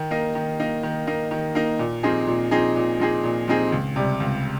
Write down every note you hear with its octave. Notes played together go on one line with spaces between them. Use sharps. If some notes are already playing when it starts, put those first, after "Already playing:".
Already playing: D#3
A#3 D#4
D#3
A#3 D#4
D#3
A#3 D#4
D#3
A#3 D#4
A#2
F3 C4 D#4 G#4
A#2
F3 C4 D#4 G#4
A#2
F3 C4 D#4 G#4
A#2
F3 C4 D#4 G#4
C#2
C3 G3
C#2